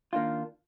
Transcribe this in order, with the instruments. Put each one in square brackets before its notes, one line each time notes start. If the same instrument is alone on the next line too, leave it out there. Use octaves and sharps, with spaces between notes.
[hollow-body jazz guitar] D#3 A#3 D4 F4